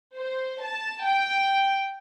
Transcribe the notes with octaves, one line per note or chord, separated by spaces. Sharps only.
C5
A5
G5